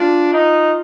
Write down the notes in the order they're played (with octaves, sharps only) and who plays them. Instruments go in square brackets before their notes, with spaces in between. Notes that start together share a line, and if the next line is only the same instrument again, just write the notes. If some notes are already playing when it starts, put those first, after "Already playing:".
Already playing: [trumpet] D4 [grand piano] F4
[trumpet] D#4